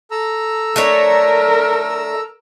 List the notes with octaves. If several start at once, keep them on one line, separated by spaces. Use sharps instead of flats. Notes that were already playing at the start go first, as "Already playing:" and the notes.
A4 A#5 E6
A3 D4 A#4 C#5